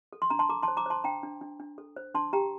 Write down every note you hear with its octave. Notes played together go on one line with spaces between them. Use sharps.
A4
C6
D4 A#5
A5 C6
A4 A#5 D6
A5 C6
C5
A#5 D6
C5 A5 C6
D4 G5 A#5
D4
D4
D4
A4
C5
D4 A5 C6
G4 G5 A#5